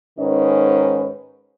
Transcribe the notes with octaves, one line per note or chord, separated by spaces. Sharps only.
G#2 D#3 C#4 B4 D#5